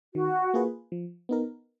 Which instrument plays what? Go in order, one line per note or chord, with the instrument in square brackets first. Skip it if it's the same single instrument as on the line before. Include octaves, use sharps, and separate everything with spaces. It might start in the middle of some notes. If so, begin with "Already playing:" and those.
[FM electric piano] D#3 [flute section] F#4
[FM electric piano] A#3 F4 G#4 B4
F3
B3 D#4 A#4